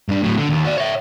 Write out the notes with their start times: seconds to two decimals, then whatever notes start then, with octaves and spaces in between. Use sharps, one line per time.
0.09 G2 D4
0.22 A2 F#3
0.37 D3
0.50 D#2
0.64 F#4 D5
0.78 C#5 E5